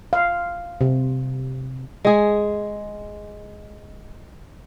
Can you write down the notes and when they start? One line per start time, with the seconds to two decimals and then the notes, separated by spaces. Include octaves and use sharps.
0.13 F5
0.81 C3
2.05 G#3 G#4